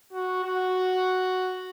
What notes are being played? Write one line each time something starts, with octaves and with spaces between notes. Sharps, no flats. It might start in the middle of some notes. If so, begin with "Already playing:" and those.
F#4
F#4